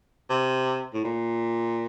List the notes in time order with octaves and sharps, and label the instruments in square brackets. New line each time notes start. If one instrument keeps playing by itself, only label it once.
[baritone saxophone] C3
A2
A#2